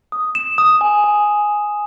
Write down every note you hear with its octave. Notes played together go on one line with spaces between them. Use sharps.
D#6
E7
D#6
G#5
G#5